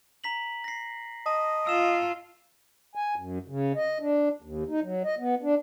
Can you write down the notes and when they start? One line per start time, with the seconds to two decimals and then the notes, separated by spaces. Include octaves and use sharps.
0.24 A#5 B6 F#7
0.64 A#6 C7
1.26 D#5 A5
1.67 F4 E6 E7
2.95 G#5
3.16 F#2
3.48 C#3
3.76 D#5
4.00 D4
4.42 D#2
4.69 D#4
4.82 F#3
5.05 D#5
5.19 B3
5.43 D4